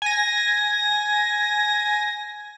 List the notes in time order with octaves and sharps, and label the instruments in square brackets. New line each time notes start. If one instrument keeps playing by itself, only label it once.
[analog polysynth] G#5 A#6